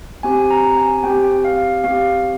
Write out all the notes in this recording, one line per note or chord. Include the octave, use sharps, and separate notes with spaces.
C4 G4 G#5
A#5
G#5
C4 G4 G5
F5
C4 G4 F5